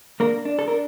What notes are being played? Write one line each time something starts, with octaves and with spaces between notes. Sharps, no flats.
A#3 D4 A#4
D4
A4
A#4
D4